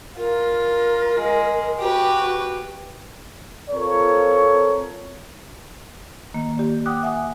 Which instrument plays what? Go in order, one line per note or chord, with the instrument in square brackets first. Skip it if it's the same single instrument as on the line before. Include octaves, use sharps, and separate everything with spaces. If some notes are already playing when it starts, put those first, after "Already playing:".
[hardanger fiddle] F4 [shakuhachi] A#4
[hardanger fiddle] G#3
[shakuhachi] F#4 [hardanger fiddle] G4 B4
[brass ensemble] C4 F4 A4 A#4 C#5
[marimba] D#3 A#3
G4 D5
F#5 G5 D6 D#6 F#6
E5 F#5 G#5 D#6